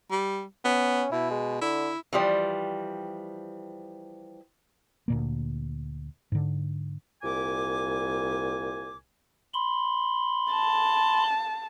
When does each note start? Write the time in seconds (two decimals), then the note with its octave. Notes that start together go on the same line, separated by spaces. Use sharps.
0.11 G3
0.65 B3 C#4
1.12 B2 E4
1.31 G#3
1.61 D3 E4
2.13 E3 F3 G3
5.08 D2 A#2 A#3
6.32 G#2 D3
7.22 C2 A#2 G#5 D6
9.54 B5 C6
10.52 A5